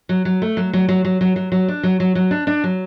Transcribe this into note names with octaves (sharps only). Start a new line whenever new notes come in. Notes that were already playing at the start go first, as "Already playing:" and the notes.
F#3
F#3
A3
F#3
F#3
F#3
F#3
F#3
F#3
F#3
D4
F#3
F#3
F#3
D4
D4
F#3